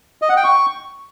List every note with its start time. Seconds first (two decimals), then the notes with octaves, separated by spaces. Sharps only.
0.22 D#5
0.29 F#5
0.37 G5
0.44 C#6